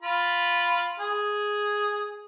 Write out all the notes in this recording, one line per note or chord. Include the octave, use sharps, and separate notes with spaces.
F4 B5
G#4